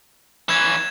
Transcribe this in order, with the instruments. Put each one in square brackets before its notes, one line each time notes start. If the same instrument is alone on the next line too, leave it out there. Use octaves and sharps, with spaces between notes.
[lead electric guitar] E3 C#4 [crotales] G#6 E7